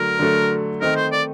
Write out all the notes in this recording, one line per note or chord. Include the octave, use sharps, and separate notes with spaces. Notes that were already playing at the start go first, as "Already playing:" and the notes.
Already playing: D3 F#3 A3 A#4
D3 F#3 A3
D#3 A3 C4 D#4 A#4
C5
D5